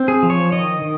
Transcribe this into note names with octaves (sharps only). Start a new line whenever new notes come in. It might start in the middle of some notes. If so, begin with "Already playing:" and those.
Already playing: C4
G#4
F3
C#5
D#3 D#5
D#3